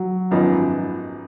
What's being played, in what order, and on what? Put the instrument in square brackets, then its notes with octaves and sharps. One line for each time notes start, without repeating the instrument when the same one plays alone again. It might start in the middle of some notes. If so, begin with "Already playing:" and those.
Already playing: [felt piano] F#3
[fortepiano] G#1 F#2 F3 B3 D#4